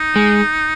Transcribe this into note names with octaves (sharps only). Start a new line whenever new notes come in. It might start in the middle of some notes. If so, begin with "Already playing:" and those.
Already playing: D#4
G#3